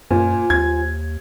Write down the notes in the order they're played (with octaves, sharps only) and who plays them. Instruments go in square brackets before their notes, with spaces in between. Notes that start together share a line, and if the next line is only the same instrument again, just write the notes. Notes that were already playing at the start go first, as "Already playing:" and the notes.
[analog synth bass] F#2 [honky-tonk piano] A#2 [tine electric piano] F4 C5 G#5
[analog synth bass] D#2 [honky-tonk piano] G#6